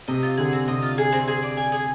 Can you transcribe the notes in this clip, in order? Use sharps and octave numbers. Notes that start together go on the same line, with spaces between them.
C3 D#5
F4
D3 G#4
C4
C3 D#5
F4
G#4
C4
G#4
D5
G#5
G#4